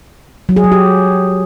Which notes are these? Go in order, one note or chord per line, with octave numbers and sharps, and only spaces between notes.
F#3
G#4
F#3
G4